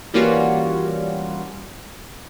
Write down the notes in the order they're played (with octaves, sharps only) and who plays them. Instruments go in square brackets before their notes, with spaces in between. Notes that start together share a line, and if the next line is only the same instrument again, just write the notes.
[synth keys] E3 G3 A#3 C#4 F4 F#4